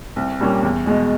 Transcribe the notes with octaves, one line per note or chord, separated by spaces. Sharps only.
C2
A#2 G3 A#3 C#4
E2
B2 G#3